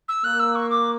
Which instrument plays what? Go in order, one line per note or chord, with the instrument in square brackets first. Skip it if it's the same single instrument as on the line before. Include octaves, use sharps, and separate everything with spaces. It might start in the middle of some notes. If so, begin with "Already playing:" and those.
[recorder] E6
[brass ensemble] A#3 [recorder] F#6
[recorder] E6
C#6
D6